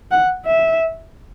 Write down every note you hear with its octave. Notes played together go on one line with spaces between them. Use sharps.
F#5
E5